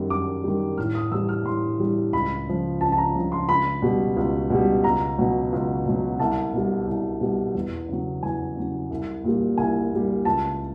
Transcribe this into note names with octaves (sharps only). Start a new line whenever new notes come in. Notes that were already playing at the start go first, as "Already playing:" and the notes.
Already playing: F#2 D#3 G3
F#2 D6
D#3 G3
A2 F6
D#6
E3 G3 E6
F6
A2 C6
E3 G3
C#2 B5
C#3 F3
C#2 A5
A5
A#5
C#3 F3
C6
C#2 B5
B2 G3
C#2
B2 G3
C#2 A#5
B2 F#3
C#2
B2 F#3
C2 A5
B2 G3
C2
B2 G3
E2
C#3 F#3
E2 G#5
C#3 F#3
C2
A#2 G3
C2 G#5
A#2 G3
C#2 A5